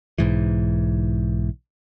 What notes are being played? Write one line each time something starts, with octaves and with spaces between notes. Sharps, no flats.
B1 G#2 E3